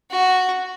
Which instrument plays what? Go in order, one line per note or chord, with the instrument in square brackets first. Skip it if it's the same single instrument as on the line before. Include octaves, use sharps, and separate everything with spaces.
[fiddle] F#4